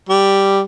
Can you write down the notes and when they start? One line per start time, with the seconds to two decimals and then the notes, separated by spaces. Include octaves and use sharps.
0.09 G3